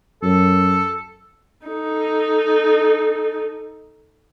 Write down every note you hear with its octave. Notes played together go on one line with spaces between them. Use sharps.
F#2 A4
D#4 A4